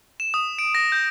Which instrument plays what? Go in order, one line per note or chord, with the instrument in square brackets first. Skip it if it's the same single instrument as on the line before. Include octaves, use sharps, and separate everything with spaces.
[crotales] E7
D#6
D7
A#6
G6